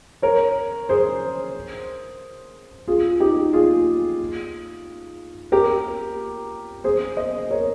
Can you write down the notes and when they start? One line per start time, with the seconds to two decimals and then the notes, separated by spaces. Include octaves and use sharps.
0.22 A#4 C#5
0.89 G#4 C5
2.88 F4 G#4
3.20 D#4 G4
3.53 F4 G#4
5.52 G4 A#4
6.84 G#4 C5
7.17 C5 D#5
7.51 A#4 C#5